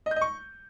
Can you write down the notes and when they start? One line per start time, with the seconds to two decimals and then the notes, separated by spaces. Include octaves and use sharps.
0.06 D#5
0.11 G6
0.16 D#5
0.21 C#6